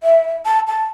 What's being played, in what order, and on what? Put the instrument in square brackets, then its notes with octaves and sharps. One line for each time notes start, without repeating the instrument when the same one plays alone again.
[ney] E5
A5
A5